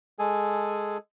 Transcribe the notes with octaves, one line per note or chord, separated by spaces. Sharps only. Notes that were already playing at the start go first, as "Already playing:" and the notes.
G#3 G#4 A4 G#5